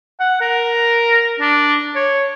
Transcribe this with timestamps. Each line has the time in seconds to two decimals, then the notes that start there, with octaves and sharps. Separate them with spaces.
0.20 F#5
0.41 A#4
1.40 D4
1.95 C#5